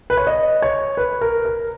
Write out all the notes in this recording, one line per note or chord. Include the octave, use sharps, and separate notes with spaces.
B4
C#5
D#5
C#5
B4
A#4
A#4